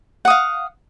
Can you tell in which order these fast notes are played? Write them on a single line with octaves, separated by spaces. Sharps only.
F#5 D#6 F5